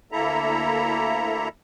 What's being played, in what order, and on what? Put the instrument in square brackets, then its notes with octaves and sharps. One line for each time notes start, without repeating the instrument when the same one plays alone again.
[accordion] D2 A#3 E4 A4 E5 A#5